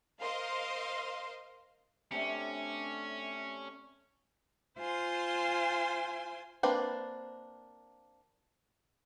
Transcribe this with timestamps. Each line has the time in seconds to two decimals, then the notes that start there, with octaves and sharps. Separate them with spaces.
0.20 A#4 C5 D#5 F5 C6
2.12 C3 A3 C#4 D4
4.78 F4 C5 G#5 C6
6.63 A#3 C4 D4 B4 D5